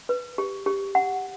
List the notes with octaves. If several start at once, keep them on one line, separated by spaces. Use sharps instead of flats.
B4
G4
G4
F#5